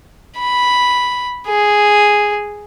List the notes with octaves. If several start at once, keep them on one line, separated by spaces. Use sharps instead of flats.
B5
G#4